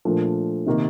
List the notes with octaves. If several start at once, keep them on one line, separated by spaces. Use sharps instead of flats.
A#2 F3 A3 D4
C3 D#3 A#3